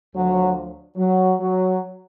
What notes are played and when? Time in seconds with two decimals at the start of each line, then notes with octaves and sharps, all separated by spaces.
0.13 D2 D3 F3 F#3
0.97 F#3
1.40 F#3